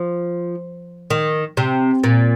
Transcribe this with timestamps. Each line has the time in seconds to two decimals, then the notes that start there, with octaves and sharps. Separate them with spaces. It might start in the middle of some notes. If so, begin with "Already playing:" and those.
Already playing: F3
1.10 D#3
1.57 C3
2.04 A#2